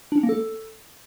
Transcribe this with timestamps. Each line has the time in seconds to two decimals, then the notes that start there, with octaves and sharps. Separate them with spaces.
0.12 D4
0.18 C#4
0.23 A#3
0.29 A4